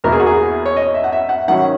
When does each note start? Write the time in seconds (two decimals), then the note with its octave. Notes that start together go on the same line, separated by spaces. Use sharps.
0.04 E2 B2 A#3 E4 A#4
0.12 G#4
0.20 F#4
0.26 G#4
0.66 C#5
0.76 D#5
0.94 E5
1.04 F#5
1.12 E5
1.29 F#5
1.48 D#3 F#3 C#4 E4 F#5